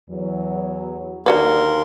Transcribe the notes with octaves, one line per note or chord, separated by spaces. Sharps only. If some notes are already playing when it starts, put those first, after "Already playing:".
E2 F#3
D#2 D3 F#4 A#4 B4 C6